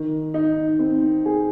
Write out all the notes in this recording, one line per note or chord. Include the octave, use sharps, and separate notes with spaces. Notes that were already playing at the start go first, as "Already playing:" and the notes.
Already playing: D#3
D#4
C4
G#4